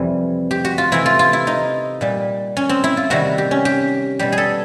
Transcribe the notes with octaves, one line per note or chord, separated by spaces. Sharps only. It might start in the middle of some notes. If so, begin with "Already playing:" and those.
Already playing: F2 C3 E3 G3
G4
F#4
F4
C3 E3 A3 E4
F4
F4
E4
D#4
A#2 G3
C#4
C4
E4
F4
C3 D#3 G3 F#4
G4
C#4
G4
B2 G3 G4
G#4
A4